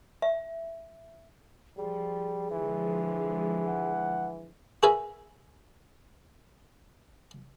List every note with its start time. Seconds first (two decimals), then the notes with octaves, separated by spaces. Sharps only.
0.22 E5
1.77 F3 G3 G#4
2.51 D3 E3 F3 G#3
3.67 F#5
4.83 F#4 G#4 A#4 B4 E5 G#5